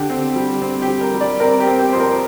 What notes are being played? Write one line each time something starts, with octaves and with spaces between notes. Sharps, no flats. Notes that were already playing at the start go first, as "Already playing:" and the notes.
Already playing: D3 G4
C4
G3
C4
G4
G3
A#4
G3
D5
C4 A#4
G4
C4
G4
F2 C5
A#4